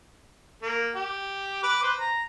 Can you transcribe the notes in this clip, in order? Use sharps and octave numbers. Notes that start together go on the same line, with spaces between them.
A#3
G4
B4 D6
B4 C5
A#5